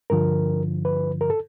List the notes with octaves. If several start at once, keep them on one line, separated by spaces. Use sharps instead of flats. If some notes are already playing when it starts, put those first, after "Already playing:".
G2 D3 F3 A#4
B4
A#4
A4